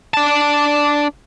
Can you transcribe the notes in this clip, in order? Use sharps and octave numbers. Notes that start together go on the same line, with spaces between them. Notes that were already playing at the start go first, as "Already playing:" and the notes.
D4 A5